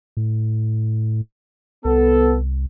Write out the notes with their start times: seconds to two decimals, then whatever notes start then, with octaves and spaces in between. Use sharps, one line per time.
0.17 A2
1.85 C2 B3 A4